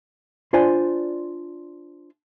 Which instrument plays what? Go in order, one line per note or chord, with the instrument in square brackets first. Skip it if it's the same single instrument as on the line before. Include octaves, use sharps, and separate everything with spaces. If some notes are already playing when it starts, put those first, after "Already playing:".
[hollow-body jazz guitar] D4 F4 C5 D5 G#5